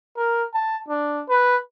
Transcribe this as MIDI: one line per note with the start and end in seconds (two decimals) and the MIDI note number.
0.17 0.44 70
0.54 0.78 81
0.89 1.23 62
1.29 1.57 71